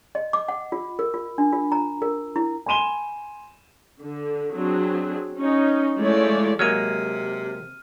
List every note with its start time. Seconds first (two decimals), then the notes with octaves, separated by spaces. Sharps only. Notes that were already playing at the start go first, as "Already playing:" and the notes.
0.15 D#5
0.33 D6
0.48 F#5
0.72 F4
0.99 A#4
1.14 F4
1.38 D4
1.52 F4
1.72 A#5
2.02 A#4
2.36 E4
2.66 G#5 B5 C6 D#7 E7 G7
4.00 D3
4.51 F#3 C4 D4 G#4
5.38 C#4 D#4
5.98 F3 G#3 A3 E4 C#5 D5
6.59 C3 F#3 G#3 A#3 F6 D#7